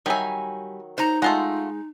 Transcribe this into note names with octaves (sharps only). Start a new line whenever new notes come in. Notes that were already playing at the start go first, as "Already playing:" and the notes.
D#3 F#3 G3 E5 G#5
D#4 C5 A#5
G#3 A3 F4 F#5